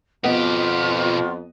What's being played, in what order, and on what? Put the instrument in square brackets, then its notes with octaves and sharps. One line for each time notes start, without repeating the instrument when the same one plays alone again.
[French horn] F2 [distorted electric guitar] B2 G4 [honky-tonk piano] B3 D#5 [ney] F4